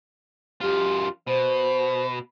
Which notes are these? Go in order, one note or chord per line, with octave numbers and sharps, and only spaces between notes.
F#2 F4 G4
B2 C5